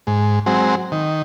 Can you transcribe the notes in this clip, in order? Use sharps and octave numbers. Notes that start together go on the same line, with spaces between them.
G#2
F#3 G#3 C4
D#3